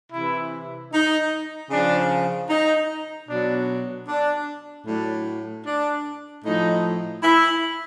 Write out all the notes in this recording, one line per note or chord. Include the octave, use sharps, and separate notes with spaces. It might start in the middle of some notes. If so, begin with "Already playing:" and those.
C3 E3 E4
D#4
C#3 F3 D4
D#4
B2 F#3 D4
D4
A2 F#3 D4
D4
A2 F3 D#4
E4